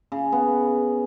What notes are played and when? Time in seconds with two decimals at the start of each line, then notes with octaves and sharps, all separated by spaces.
0.12 C#3
0.32 B3